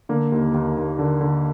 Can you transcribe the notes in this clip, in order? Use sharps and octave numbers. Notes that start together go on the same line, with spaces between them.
D3 A#3
D#2
D#2
D#2
D3
D3